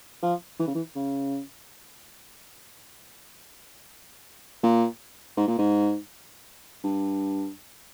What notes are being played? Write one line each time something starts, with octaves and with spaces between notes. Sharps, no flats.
F3
E3
C#3
E3
C#3
A#2
G#2
A#2
G#2
G2